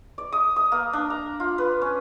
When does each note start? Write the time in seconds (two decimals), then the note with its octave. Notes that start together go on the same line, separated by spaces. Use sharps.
0.18 D5
0.32 D#6
0.56 D#6
0.72 A#3
0.93 D4
1.10 A#5
1.40 F4
1.58 B4
1.82 C#4